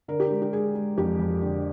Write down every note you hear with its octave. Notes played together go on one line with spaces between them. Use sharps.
D3 A#4
G4
G#3
G4
G#3 G#4
G#3
F2 G4
F2
D3